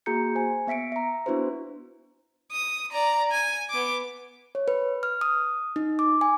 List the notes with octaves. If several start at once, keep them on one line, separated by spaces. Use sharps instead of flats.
A#3 F#4 G#4 A#5 G6 C#7
C5 G#5
B3 E5 B6 C#7 D7
E5 A#5
B3 D4 E4 F#4 B4 C5
D#6
D5 A#5
G#5
B3 D6
C#5
B4
F6
D#6
D#4
D6
G#5